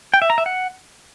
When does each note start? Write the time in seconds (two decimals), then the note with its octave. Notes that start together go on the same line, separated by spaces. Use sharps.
0.14 G5
0.22 E5
0.30 A#5
0.38 E5
0.46 F#5